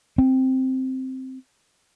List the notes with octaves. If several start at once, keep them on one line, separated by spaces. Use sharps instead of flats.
C4